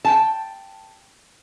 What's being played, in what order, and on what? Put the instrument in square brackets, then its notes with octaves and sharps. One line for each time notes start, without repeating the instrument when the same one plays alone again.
[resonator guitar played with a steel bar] G5 A5